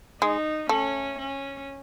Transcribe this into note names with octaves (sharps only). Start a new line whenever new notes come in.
G#3 D#4
A3 C#4
C#4